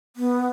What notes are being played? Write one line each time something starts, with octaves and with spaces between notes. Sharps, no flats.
B3